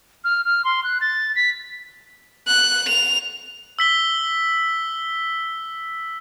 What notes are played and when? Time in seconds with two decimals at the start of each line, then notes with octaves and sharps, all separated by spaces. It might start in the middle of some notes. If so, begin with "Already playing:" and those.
0.24 F6
0.45 F6
0.64 C6
0.84 F#6
1.01 A6
1.35 B6
2.47 F#6
2.88 F7
3.79 E6 B6 G7